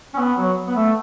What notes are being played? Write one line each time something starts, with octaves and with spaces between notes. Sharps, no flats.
C#4
B3
F#3
B3
A3